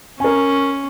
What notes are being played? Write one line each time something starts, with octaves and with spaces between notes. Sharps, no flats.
C#4 A#4 G#5